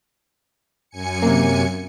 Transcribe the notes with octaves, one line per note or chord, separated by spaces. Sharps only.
F#2 G#5 C#7
C3 A#3